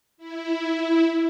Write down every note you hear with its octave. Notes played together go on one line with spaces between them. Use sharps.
E4